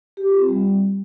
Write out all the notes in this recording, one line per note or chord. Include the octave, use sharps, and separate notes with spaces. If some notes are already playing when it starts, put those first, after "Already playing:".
G4
F4
C4
G3